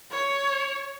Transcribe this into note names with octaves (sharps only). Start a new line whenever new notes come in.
C#5